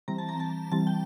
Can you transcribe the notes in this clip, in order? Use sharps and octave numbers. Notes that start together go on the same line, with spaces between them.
E3 G3 C4 A#5
A5
A#5
A5
E3 G3 C4 A5
G5